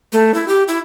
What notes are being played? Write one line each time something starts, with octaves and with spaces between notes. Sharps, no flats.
A3
E4
G4
E4